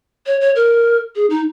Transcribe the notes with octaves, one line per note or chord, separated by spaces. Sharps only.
C#5
C#5
A#4
G#4
D#4